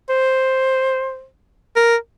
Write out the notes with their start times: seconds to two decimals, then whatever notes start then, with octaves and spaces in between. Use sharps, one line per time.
0.09 C5
1.76 A#4